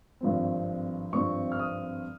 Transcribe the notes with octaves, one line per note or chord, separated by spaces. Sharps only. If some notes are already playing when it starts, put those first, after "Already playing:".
G#1 G2 F3 C4
G#1 G2 F3 C4 C#6
F6
D#6